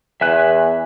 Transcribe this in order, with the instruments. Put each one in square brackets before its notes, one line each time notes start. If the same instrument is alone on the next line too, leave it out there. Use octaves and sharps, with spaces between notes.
[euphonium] E2 [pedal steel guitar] E5 G#5 F#6